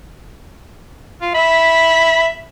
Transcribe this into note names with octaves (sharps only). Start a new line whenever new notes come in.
F4
E5 B5